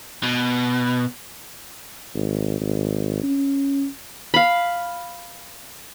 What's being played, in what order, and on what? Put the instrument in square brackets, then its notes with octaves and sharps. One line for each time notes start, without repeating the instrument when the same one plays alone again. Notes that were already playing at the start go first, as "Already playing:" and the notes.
[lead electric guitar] B2
[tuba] G#1
G#1
C#4
[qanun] F5 B5